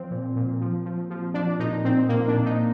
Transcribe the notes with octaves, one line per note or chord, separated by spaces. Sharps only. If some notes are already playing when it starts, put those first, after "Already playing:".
Already playing: F3 C4
A#2
A#2
F3
F3
F3
F3 D4
A#2 D#4
A#2 C4
A#2 A#3
D4
A#2
D#4